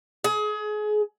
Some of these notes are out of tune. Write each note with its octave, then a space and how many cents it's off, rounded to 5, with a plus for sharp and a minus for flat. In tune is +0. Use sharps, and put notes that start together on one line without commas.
G#4 +30